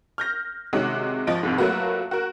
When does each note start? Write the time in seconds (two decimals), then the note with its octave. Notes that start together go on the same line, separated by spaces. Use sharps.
0.18 F6 G6 A#6
0.73 C3 D#3 G#3 C#4 F#4
1.27 G#1 F3 D#5 D7
1.43 C2 F2 G#2
1.58 F#3 A3 A#3 F4 F#4 B4
2.11 F#4 A#4